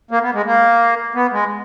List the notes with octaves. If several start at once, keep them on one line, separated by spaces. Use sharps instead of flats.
A#3
B3
G#3
A#3
B3
G#3